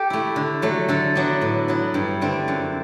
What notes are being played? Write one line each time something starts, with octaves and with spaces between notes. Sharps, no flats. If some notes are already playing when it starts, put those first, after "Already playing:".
Already playing: G4 A4
A3 E4
D3
F#3 A3
D3 A4
F#3 B3 D4
A2
F#3 B3 E4
G2
D3 A3 C4
F#2